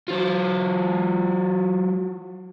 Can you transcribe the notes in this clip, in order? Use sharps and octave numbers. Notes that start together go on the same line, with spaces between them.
F#3 F4